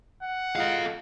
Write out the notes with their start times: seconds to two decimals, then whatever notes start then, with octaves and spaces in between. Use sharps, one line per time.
0.22 F#5
0.56 G#3 F4 A4 D#5 F5